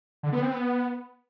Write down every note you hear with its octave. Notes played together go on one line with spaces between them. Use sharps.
D3
B3
C4
B3